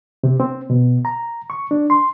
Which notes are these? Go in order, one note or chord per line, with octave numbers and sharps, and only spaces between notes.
C3
C4
B2
A#5
C#6
D4
C6